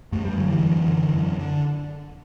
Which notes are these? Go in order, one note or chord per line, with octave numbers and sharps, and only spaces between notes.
F#2 A3
G3
D3 F#3
E3
F#2
D3
F#2
D3